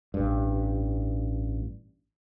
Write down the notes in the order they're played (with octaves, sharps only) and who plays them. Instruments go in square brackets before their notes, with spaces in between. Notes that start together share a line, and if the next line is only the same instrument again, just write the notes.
[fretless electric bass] A1 G2